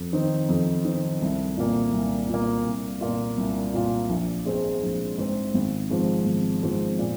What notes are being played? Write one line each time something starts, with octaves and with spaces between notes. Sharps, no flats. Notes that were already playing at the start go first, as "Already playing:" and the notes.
Already playing: F2
D#3 C4 D#4
F2
D#3 C4 D#4
C2
A#2 A#3
C2
A#2 A#3
C2
A#2 A#3 F4
C2
A#2 A#3 F4
A#1
G#2 G#3 C4
A#1
G#2 G#3 C4
G#1
G#2 F3 C4
G#1
G#2 F3 C4
A#2